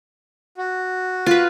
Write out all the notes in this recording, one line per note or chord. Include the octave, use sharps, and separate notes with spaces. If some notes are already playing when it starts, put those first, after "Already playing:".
F#4
F4 B4